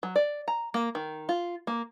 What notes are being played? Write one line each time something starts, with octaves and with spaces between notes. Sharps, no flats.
F#3
D5
A#5
A#3
D#3
F4
A#3